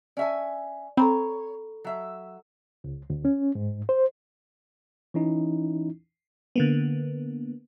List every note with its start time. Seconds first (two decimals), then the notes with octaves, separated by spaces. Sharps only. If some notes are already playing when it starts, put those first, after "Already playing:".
0.17 C#4 D5 E5 G#5
0.97 C4 A4 C#5 A#5 B5
1.84 F#3 E5
2.84 C#2
3.10 D2
3.25 C#4
3.55 G#2
3.89 C5
5.14 E3 C#4 D#4 E4
6.56 D3 A#3 B3